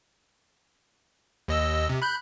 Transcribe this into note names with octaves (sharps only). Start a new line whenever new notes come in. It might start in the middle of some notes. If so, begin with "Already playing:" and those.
D#2 D#5 E6
C3
B5 F#6 G6